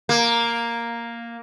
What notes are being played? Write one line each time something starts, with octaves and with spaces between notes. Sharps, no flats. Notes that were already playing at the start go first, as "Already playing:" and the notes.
A#3